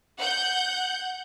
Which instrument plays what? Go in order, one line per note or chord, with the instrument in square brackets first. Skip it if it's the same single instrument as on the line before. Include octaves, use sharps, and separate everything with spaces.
[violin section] F#5 G6